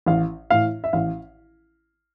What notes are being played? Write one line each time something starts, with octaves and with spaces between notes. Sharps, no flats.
A1 F5
A2 E3 F5
E5
A1 F5